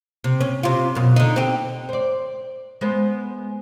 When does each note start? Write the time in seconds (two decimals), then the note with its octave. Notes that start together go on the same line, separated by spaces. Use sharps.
0.24 C3
0.41 C#4
0.63 C3 F4
0.95 F#2 B2
1.16 D3 D#4
1.36 C4 G4
1.89 C5 D5
2.81 G#3 B3 C5